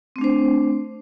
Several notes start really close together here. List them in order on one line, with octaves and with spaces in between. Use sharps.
C4 A3 D4 C5